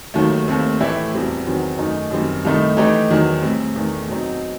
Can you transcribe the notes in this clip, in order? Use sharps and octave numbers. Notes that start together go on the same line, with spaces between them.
D#2 D#3 F#3 A3
D#2 D#3 A3 C4
A2 E3 A3 E4 G4
E2 B2 G3 C4
E2 D#3 F#3 C4
F#2 D#3 A3 D#4
F#2 D#3 G3 C4
C2 C3 D#3 A3 D#4
E3 A3 D#4 G4
E2 D#3 F#3
A2 G3 C4
E2 D#3 A3
B2 F#3 C4 D#4